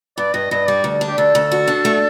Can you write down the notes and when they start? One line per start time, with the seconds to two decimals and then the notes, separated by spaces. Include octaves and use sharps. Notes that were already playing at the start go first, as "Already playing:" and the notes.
0.18 G2 D5
0.34 G2 D#5
0.51 G2 D#5
0.68 G3 D5
0.84 D2
1.01 D4
1.08 G4
1.18 D2 A4
1.35 D2
1.52 F#4
1.68 D4
1.85 A3